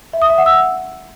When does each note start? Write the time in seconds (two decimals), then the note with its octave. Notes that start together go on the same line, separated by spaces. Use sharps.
0.13 E5
0.22 D#6
0.30 E5
0.38 F#5
0.46 E6